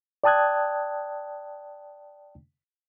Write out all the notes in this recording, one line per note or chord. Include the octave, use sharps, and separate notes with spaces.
D5 G5 A5 D#6 F#6 G#6